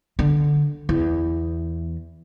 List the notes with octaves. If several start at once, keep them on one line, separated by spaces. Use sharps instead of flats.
D3
E2